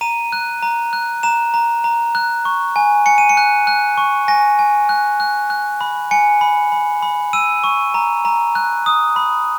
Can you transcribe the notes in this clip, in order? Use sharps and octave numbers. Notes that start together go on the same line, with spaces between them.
A#5 D#7
F#6
A#5
F#6
A#5 E7
A#5
A#5
F#6
C#6
G#5
G#5 C#7
D#7
C#7
F#6
F#6
C#6
G#5 A#6
G#5
F#6
F#6
F#6
B5
G#5 C#7
B5
B5
B5
E6 D#7
C#6
A#5
A#5
F#6
D#6
B5